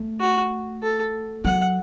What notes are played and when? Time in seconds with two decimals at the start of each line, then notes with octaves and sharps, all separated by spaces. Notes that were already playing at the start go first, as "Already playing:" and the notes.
Already playing: A3
0.20 F#4
0.83 A4
1.45 F#3 F#5